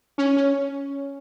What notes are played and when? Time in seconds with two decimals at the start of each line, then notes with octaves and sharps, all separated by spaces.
0.18 C#4
0.37 C#4